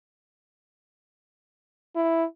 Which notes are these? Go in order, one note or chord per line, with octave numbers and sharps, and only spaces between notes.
E4